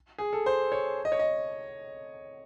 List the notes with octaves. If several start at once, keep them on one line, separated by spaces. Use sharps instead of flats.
G#4
A4
C5
C#5
D#5
C#5
D#5